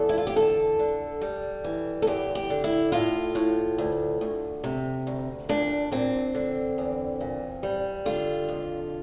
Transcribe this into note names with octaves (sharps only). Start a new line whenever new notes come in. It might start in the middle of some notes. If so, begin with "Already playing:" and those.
Already playing: E2 A4
E4
F4
G4
D3 A4
D3
G3
E3
A4
E2 G4
G4
D3
E4
A2 F4
A2
D2
D2
C3
D2
A#2 D4
A#2 C4
D3
E2
A#2
G3
D3 F4
F2